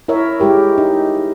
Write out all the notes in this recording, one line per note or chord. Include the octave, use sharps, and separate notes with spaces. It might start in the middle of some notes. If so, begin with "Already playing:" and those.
E4 A#4 C#5 E5
G#3 E4 G4 A#4
D#4